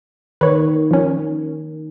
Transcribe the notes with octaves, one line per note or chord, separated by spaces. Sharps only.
D#3 B4 C#5
F3 C#4